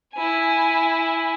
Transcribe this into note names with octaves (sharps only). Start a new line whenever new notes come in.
E4 G#5